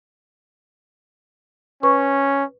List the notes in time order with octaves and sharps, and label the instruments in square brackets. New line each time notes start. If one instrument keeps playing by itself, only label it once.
[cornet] C#4 [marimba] B4 C#6